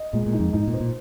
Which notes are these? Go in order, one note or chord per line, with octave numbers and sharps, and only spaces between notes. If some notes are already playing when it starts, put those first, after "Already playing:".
Already playing: D#5
A#2 G#3
A#2
D#4
F2
G#2 D#4
A#2
C5
A#2